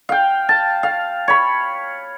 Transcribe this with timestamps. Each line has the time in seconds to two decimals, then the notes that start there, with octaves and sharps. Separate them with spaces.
0.09 F5 G5
0.49 A5
0.83 F5
1.28 C#5 B5